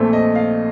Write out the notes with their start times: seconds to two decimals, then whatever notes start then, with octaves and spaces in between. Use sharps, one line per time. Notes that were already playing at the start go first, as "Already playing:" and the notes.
Already playing: A#1 A#2 A3 C4
0.13 D#5
0.35 F5